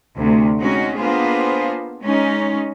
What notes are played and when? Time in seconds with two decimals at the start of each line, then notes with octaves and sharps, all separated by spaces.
0.16 D2 C3
0.59 G#3 C4 C#4 D#4 F#4
0.96 A#3 B3 D4 F4 G#4 C5
2.03 G#3 C#4 D#4